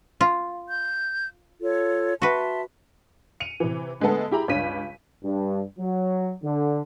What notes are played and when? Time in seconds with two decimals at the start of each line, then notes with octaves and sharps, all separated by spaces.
0.21 F4
0.69 G6
1.62 F4 A4 C#5
2.22 F#4 B4 E5 A5 C6
3.40 C#7 D#7 F7
3.60 C3 E3
4.00 D3 G#3 A3 B3 A4
4.31 E4 G4 G#4 A#5 B5
4.48 C#2 G2 D4 C#5 B6 D#7
5.23 G2
5.79 F#3
6.44 D3